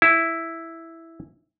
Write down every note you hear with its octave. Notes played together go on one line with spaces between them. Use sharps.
E4